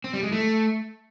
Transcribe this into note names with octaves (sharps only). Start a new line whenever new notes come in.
C4
G3
G#3
A3